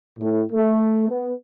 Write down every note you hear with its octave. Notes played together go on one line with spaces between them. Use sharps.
A2
A3
B3